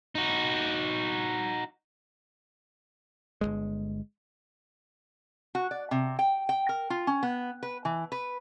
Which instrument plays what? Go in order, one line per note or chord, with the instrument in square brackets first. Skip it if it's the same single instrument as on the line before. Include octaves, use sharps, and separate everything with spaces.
[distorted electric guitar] D#4 F#4
[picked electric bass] G1 C#2 G#3
[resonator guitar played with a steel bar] F#4
D5
C3
G5
G5
A#4
F4
C#4
B3
B4
E3
B4